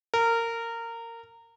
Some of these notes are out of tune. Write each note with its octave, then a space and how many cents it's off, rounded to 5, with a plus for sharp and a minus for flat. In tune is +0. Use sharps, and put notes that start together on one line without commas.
A#4 -20